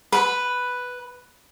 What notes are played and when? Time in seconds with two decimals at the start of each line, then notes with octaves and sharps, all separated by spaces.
0.12 B4 B5